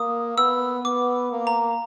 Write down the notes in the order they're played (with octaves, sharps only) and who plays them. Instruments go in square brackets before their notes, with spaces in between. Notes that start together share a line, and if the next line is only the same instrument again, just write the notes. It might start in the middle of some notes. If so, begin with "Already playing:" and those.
Already playing: [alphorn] A#3 [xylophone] D#6
[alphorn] B3 [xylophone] E6
[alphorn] B3 [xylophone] D6
[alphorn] A#3
[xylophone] A#5